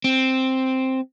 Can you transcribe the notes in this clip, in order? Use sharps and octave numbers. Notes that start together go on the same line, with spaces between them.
C4